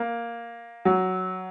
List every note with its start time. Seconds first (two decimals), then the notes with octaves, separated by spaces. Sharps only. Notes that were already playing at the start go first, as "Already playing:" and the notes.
Already playing: A#3
0.85 F#3